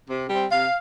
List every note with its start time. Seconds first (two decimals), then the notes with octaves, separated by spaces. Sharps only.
0.09 C3
0.30 G3 C4
0.51 C3 F5